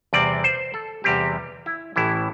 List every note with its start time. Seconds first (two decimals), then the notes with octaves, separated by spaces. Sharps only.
0.13 E2 C3 G3 C4 D5
0.44 C5
0.74 A4
1.04 E2 C3 G3 C4 G4
1.66 E4
1.96 A1 A2 E3 E4